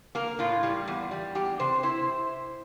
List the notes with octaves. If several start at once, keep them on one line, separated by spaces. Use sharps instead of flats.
A#3 A#4
A2 F4
G3
E2
G3
E2 G4
C3 C5
E4 C5